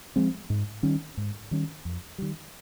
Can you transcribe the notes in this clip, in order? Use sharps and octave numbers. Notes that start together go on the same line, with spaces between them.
F3 G#3 C4
G#2
D#3 G3 C#4
G#2
D#3 G3 C#4
F2
D#3 G3